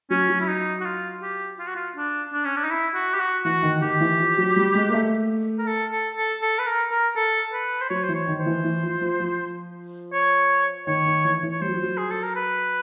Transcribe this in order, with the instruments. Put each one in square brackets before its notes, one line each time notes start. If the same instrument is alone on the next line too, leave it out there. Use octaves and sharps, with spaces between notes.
[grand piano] F#3 [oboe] C#4
[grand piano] F#3
[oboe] E4
D#4
F#4
F4
G4
F4
F#4
F4
D4
D4
C#4
D4
D#4
E4
F#4
G4
F#4
[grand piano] E3 [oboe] F#4
[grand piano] D#3
[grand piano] D#3 [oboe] G4
[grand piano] E3
F3
F#3
G3
G#3
A#3
A3
[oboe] A#4
A4
A4
A4
A4
B4
A#4
A#4
A4
B4
C5
[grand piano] F#3 [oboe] C#5
[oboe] C5
[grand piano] E3
[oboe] C#5
[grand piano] D#3
[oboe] C5
[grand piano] E3
E3
F3
F3
F3
[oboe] C#5
[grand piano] D#3 [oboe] C#5
[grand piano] D#3
E3
E3
[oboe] C#5
[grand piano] G3 [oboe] C5
[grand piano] F#3
F3
F#3
[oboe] G#4
A4
A#4
B4